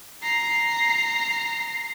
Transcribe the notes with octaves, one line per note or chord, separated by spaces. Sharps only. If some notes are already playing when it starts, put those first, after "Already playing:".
A#5 C7